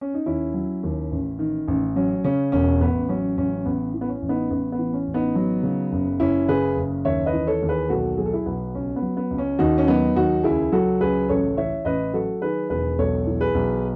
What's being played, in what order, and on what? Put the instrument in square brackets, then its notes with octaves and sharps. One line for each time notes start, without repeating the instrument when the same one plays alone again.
[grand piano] C#4
D#4
D#2 C#4 E4
F#3
D#2
A1
D#3
A1
F#3 C#4
C#3 C#4
E1 C#4
A1 B3
F#3 C#4
A1 C#4
A1 B3
E3
B3
C#4
A1
B3 D#4
A1 B3
B3
E3
C#4
A1
B3 D#4
F#3
C#3
F#1
F#1 C#4 E4
C#3 G#4 B4
F#1
D#2 C#5 E5
B4 D#5
E3
A4 C#5
D#2
G#4 B4
B1 F#4 A4
F#3 G#4
A4
E4 G#4
B1 B3
C#2 C#4
B3
F#3
B3
C#2
C#4
D#2 D#4 F#4
C#4
F#3 B3 D#4
D#2 D#4 F#4
C#2 E4 G#4
F#3 F#4 A4
C#2 G#4 B4
A1 A4 C#5
E3 C#5 E5
A1 B4 D#5
F#3 F#4 A4
D#3 G#4 B4
E1 G#4 B4
B1 A4 C#5
E3
G#4 B4
B1